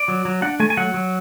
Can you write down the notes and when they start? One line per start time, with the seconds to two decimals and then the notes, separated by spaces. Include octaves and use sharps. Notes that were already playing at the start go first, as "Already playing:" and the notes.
Already playing: D5
0.08 F#3
0.25 F#3
0.42 D4 F#5
0.60 A3 G#5
0.70 G#5
0.77 F#3 F#5
0.94 F#3